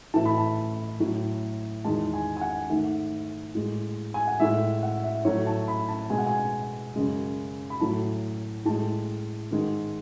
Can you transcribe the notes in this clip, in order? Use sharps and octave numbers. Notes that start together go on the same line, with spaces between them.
A2 E3 A3 A5
B5
A5
A2 F#3 A3
E2 D#3 G#3 A5
G#5
G#5
F#5
G#2 D#3 A3
A2 G#3
G#5
F#5
A2 G#3 E5
F#5
E5
A2 F#3 A3 C#5
A5
B5
A5
B2 G#3 G#5
F#5
G#5
F#2 C#3 G#3
B5
A2 F#3 A3 A5
A2 G#3 A5
G#2 D#3 G#3